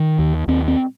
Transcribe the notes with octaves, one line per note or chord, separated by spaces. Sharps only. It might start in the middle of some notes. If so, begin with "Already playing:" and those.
Already playing: D#3
D#2
D#2 C4
C4